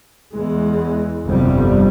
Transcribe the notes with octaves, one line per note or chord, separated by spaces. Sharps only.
E2 E3 G#3
G1 F2 C3 G3